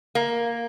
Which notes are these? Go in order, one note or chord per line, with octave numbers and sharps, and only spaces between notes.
A#3